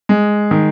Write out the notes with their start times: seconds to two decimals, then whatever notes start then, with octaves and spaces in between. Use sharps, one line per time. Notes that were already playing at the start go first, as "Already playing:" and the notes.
0.09 G#3
0.51 D#3